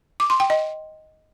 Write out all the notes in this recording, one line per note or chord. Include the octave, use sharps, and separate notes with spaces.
D6
C6
G5
D#5